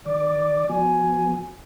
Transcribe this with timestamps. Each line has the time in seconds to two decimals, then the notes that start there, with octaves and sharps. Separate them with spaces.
0.06 D#3 D5 D6
0.69 F3 B3 F#4 G#5